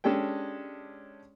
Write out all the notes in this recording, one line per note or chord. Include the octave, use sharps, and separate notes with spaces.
G#3 C#4 D4 G4 A4 G5